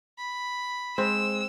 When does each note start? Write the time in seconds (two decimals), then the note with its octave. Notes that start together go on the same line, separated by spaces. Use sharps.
0.18 B5
0.98 G#3 C4 E6